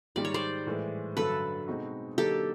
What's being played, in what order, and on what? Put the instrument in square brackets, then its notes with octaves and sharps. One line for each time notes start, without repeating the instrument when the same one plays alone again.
[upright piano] G#2 D#3 G3 [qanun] D5
[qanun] C#5
C5 D5
[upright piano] A2 E3 G#3
[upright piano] G2 D3 F#3 [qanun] A4 B4
[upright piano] B2 G#3 C4 D#4 F#4
[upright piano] D3 F#3 A#3 D#4 [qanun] G4 A4